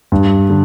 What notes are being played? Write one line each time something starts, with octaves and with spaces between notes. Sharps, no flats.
G2
D3